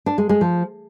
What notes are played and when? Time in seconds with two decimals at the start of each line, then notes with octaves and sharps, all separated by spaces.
0.06 D4
0.18 G#3
0.29 G#3
0.41 F3